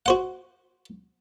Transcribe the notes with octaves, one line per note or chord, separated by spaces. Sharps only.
F#4 C5 F#5